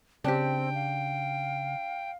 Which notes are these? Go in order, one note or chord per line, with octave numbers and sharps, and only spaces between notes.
C#3 C4 D4 G4 G5
F5